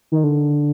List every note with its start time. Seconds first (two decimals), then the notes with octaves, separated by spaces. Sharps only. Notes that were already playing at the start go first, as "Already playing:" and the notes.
0.12 D#3
0.24 D3